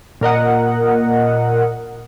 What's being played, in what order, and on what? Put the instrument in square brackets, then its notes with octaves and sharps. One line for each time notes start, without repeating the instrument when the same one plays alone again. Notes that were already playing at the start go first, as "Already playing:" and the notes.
[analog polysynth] A#2 A#4 D#5 F#5